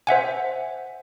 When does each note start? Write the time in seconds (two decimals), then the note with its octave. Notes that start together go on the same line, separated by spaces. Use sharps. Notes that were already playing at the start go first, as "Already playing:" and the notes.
0.07 C5 E5 F#5 G#5